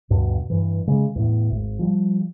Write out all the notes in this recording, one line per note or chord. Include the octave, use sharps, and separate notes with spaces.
D2 G2 B2
G2 E3
C#3 G#3
E2 A2
G#1
F3 G3